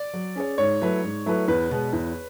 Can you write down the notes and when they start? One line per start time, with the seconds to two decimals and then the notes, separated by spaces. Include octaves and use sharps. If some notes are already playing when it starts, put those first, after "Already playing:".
Already playing: D5
0.14 F#3
0.35 C#4 G#4 C#5
0.58 G#2 C#5
0.81 F#3 A3 E4 B4
1.04 G#2
1.26 F#3 A3 E4 B4
1.48 E2 B4
1.70 B2 G#3 B3
1.93 E2